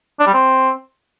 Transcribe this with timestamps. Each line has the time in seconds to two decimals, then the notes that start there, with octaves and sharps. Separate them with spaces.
0.20 D4
0.27 G3
0.34 C4